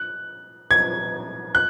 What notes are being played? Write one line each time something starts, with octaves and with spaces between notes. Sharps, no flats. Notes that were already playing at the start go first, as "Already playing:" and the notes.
Already playing: F#6
G#6
F#6